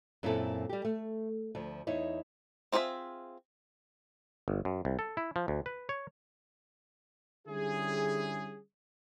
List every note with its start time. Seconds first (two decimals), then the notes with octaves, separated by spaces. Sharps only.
0.23 F#2 A#2 C4 E4 F4 A4
0.69 G3 G4
0.85 A3
1.55 D2 F3
1.87 E2 D#4 E4 C#5
2.72 C4 F4 G#4 C#5 E5
4.48 G1
4.65 F#2
4.85 C2
4.99 A4
5.17 E4
5.36 F3
5.48 D2
5.66 B4
5.89 C#5
7.48 D3 G3 C#4 E4 G#4